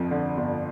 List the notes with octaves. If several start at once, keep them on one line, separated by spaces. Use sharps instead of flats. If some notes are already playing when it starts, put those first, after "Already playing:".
Already playing: G1 F2 F3
D3
G1